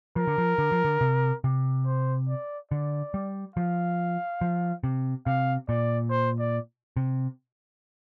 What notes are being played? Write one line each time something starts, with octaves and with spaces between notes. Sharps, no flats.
F3 A#4
D3
F3
D3
F3
D3
C3
C3
C5
D5
D3 D5
G3
F3 F5
F3
C3
C3 F5
A#2 D5
C5
D5
C3